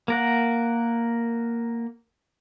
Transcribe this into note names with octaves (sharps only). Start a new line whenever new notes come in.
A#3 A#4 F#5